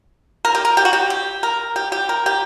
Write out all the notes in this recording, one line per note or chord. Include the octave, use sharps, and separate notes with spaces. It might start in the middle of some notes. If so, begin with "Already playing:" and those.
A#4
G4
A#4
G4
F#4
G4
G4
A#4
G4
G4
A#4
G4